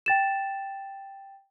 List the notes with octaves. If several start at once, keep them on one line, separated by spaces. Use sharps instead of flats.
G5 A6 E7